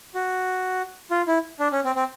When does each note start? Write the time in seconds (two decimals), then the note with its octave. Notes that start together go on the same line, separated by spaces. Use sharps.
0.15 F#4
1.11 F4
1.27 E4
1.60 D4
1.72 C#4
1.84 C4
1.95 C4